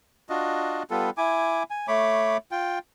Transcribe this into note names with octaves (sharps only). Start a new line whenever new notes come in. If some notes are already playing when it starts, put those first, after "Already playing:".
D4 F4 F#4 D#5
G3 B3 F4 A4
E4 G#5 D6
G#5
A3 C#5 B5 D6
F4 G5